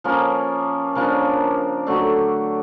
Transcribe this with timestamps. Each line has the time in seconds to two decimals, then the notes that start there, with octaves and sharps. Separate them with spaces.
0.04 F3 A#3 C#4
0.95 C#3 F3 A#3 D4
1.87 D3 F#3 A3 D4